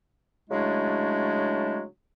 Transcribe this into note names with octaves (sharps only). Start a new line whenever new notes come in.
C#3 F#3 G#3 A3 D4 E4